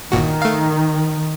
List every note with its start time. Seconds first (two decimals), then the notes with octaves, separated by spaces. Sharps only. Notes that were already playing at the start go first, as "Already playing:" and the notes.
0.12 G1 A#2 D#3 F#4
0.42 A3 F5